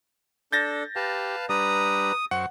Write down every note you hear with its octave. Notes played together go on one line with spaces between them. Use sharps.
D4 A4 G6 A6 A#6
G4 B4 F5 A5
G3 D4 B4 A#5 D#6
F#2 C5 F#5 C#6